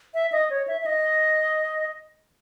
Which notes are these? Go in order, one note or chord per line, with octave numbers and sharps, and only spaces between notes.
E5
D#5
C#5
E5
E5
D#5